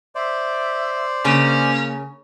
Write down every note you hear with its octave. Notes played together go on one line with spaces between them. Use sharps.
C5 D5 E5
C#3 A#3 C#4